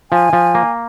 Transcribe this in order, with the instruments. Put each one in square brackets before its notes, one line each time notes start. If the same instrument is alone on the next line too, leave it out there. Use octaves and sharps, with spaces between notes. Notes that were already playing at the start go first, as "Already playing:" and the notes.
[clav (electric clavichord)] F3 [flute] G#5
[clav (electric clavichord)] F3
A#3